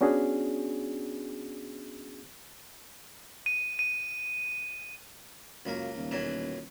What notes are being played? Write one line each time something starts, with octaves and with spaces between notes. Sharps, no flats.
B3 C#4 D4 F#4 G#4
D#7
D#7
C#2 F#2 A#3
D#1
F#2 B2 E3